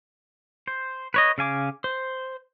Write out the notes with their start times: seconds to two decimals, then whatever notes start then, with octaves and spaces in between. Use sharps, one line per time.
0.68 C5
1.14 B4 C#5 D#5
1.38 C#3 F5 G#5 D6
1.84 C5